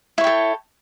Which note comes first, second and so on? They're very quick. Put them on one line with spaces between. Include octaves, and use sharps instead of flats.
E4 C#5 G5 A4